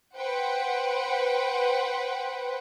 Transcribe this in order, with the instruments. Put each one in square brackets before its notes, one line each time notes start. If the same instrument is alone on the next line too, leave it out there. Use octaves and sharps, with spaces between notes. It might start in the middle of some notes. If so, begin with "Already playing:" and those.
[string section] B4 C5 F#5 G5